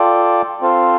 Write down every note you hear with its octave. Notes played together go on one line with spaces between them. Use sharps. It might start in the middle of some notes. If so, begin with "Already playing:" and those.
Already playing: F4 A4 D5 G5
C4 F4 A4 C5 F5